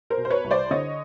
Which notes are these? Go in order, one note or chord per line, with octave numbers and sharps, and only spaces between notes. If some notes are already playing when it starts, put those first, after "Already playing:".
A#4 C5
B2
C5
B4 C#5
C2
C5 D5
D3 C#5 D#5